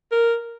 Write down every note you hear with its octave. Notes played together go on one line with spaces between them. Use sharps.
A#4